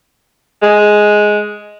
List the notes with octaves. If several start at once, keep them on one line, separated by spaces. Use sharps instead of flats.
G#3